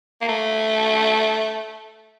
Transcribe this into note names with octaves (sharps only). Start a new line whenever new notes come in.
A#3
A3